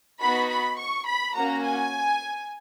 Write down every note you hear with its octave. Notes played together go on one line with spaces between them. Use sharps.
B3 D#4 F#4 B5
B5
C#6
B5
A#3 C#4 F#4 A#5
G#5